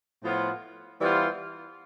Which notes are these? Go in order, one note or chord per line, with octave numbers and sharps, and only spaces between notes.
A2 F3 B3 F4
E3 G3 B3 F4 C5